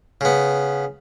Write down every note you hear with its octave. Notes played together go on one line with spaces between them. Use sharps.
C#3 B3